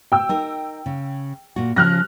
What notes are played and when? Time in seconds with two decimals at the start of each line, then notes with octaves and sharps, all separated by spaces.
0.12 G5 E6
0.29 D#4 A#4
0.86 C#3
1.56 A#2 F#4
1.76 C#3 F3 C#4 F6 F#6 A#6